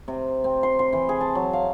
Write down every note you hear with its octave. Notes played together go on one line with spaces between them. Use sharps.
C3
C4
C6
C6
E3
G#4
A5
F#3
F5